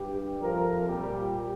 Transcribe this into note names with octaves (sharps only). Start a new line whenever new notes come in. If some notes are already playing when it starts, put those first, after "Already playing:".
Already playing: G2 G3 G4
F2 C3 F3 A#4
A#2 G3 G4